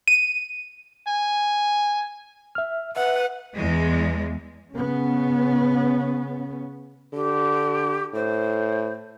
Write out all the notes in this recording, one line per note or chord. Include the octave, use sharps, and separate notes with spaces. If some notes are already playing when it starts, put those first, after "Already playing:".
D#7
G#5
E5 F6
B4 E5 F#5
E2 G#3
C#3 B3 C#4
D3 G4
A2 C5